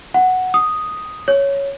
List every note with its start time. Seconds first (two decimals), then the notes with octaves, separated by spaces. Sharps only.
0.14 F#5
0.54 D#6
1.28 C#5